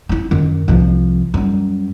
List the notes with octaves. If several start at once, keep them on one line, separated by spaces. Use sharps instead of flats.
C4 E4
F#2 D#3
C2 F3
F#2 G3